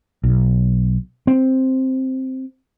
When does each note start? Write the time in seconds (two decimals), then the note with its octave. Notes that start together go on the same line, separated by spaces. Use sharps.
0.24 B1
1.27 C4